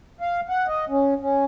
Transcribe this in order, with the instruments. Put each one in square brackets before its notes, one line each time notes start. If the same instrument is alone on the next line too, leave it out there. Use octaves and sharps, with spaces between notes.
[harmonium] F5
F#5
D#5
C#4
C#4